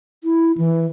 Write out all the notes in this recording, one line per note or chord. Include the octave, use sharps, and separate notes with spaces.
E4
E3